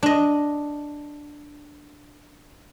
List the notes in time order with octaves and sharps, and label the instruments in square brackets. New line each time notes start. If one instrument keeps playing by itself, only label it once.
[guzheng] D4 D#5